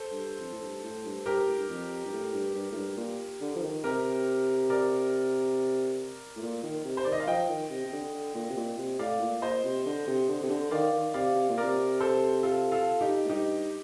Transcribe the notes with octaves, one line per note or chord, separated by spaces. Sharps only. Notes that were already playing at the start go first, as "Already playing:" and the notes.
Already playing: A4 C5
G2
F2
A2
G2
A2
G2
G2 G4 A#4
A2
G2
F2
G2
A2
G2
G2
A2
G2
A#2
D3
F3
D#3
C3 G4 A#4
A#4 D5
A2
A#2
D#3
C3
C5
D#3 D5
D#5
F5
F3 D#5 G5
D#3
C3
C3
D3
D3
A#2
C3
A#2
C3
A2 D5 F5
A#2
A#2 C5 D#5
C3
D3
C3
D3
C3
D3
D#3 D5 F5
D#3
C3 D5 F5
C3
A#2
A#4 D5
C3
A4 C5
F4 A4
F4 A4
D#4 G4
A2
G2 D#4 G4